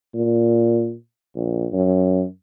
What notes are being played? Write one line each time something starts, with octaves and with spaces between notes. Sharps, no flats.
A#2
A#1
F#2